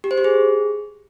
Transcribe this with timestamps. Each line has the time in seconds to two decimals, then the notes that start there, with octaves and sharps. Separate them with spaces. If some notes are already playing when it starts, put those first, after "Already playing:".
0.04 G4
0.11 C5
0.18 G4
0.24 G#4